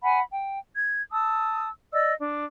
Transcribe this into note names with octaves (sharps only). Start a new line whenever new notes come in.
F#5 G#5 B5
G5
G#6
A5 D#6 E6
D5 D#5 E6
D4